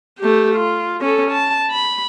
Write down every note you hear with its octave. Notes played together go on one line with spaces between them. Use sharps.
A3 G4
F4
C#4 A4
A5
B5